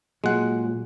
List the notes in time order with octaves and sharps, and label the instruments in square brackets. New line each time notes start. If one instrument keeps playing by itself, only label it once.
[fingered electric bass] A#2 F#3 [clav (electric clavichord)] G#3 F#5